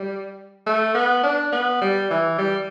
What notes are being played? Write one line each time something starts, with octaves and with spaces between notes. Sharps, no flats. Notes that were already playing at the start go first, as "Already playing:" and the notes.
Already playing: G3
A3
B3
D4
B3
G3
E3
G3